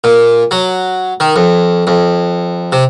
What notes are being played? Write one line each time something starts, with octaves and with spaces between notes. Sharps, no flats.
A#2
F#3
D#3
F2
F2
C3